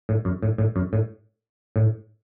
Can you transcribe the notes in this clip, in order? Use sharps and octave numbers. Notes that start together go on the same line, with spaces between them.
A2
F#2
A2
A2
F#2
A2
A2